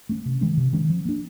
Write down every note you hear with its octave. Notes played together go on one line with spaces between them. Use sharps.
A3 C#4
C3
D#3 G#3 C#4
C3
D#3 G#3 C#4
F3
A#3 D4